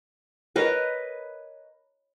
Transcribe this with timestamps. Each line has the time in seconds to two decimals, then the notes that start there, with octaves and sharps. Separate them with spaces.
0.56 A#4 B4 C#5 D#5